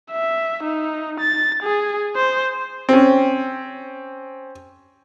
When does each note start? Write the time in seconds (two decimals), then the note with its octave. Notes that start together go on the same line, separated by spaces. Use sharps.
0.12 E5
0.64 D#4
1.20 A6
1.63 G#4
2.16 C5
2.89 C4 C#4